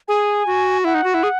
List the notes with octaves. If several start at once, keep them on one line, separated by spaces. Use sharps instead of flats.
G#4 G#5
F#4
E4 F#5
D#4
F#4
E4
G#4